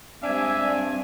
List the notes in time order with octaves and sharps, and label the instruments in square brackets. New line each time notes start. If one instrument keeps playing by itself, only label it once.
[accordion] G2 G#5 [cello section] G#3 C4 [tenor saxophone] D4 [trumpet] E5